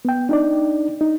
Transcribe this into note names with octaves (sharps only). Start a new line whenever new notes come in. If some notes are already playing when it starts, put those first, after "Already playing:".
B3 G5
D4 D#4 D5
D#4